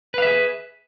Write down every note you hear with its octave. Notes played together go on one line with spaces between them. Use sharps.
G#4 B4 E5 F5